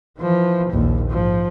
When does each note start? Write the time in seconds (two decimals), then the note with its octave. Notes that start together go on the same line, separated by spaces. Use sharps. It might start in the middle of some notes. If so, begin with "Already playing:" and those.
0.18 E3 F3
0.71 A#1 D#2
1.10 G#2 F3